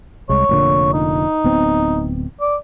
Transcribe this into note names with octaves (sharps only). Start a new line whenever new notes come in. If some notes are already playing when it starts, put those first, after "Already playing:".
C2 G#3 C#5
F1 A#2 D3
D#4
D1 B3 C4
D5